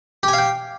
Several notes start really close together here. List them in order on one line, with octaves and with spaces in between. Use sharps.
G4 G#5 F5 G5